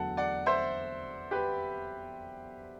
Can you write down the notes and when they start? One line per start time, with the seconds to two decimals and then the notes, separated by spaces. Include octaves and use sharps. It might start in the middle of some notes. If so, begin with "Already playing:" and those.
Already playing: E2 D3 F#3 A3 F#5 A5
0.17 D5 F#5
0.46 C5 E5
1.31 G4 B4